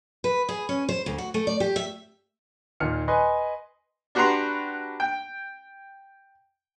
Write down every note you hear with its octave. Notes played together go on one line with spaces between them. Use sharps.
B4
G#4
C#4
C5
D2
F#4
A3
D5
G4
E5
D#2 A#2 F6 C#7
B4 D#5 G#5 C6
D4 F#4 G4 B4 A#5 C6
G5